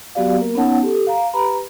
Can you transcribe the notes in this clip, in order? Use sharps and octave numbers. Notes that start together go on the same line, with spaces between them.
F#3 B3 F#4 G4 D5 F5
A#3 A#4
B3 C#4 D#4 C#5 F#5 A5
G4 A4
F5 A#5
G4 B4 A#5 B5